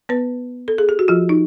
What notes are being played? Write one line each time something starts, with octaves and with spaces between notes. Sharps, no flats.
B3 B4
A4
G#4
G4
F#4
F3 F4
D#4